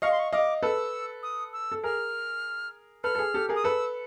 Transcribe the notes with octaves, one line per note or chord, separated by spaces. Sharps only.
D#5 F5 C#6
C6
C#6
D#5 F5 D6
A4 B4 E6
D#6
E6
A4
G#4 A#4 F6
A4 B4 F6
A4
G#4
G4 A4
G#4 A#4
D#6
A4 B4 E6